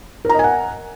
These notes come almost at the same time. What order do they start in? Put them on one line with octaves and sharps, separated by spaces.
A#4 A#5 D#5 G#5 F#5